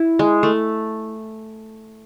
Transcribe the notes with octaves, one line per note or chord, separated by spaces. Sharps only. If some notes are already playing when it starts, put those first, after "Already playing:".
Already playing: E4
G#3
A3